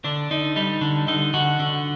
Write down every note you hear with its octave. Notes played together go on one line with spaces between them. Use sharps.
D3 D4
D3 D#4
G3 D#4
D3
D3 D#4
D3 F#4
D3